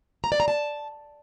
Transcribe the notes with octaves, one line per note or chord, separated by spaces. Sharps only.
A#5
D5
A#5
A5